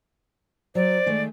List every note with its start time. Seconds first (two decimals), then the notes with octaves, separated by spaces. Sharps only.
0.75 F#3 C5 D5
1.06 D#3 G#3 A3